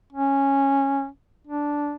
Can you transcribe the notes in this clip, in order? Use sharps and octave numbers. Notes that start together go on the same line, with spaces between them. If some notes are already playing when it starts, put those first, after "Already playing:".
C#4
D4